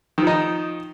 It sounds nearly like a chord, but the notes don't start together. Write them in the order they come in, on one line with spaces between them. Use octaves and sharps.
D#3 F3 D#4